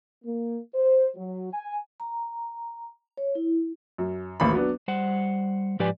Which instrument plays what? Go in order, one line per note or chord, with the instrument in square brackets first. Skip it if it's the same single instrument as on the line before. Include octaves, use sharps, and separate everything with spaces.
[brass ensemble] A#3
C5
F#3
G#5
[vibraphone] A#5
C#5
E4
[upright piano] F#2
A1 D#2 A#3 B5
F#3 B3 D4
[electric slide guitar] G3 C5 F#5
G#2 F3 G4 B4 D5 G#5